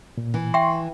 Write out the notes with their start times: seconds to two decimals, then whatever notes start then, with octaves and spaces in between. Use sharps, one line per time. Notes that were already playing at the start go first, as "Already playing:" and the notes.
0.18 A#2
0.34 E3
0.54 E5 G5 C6 C#6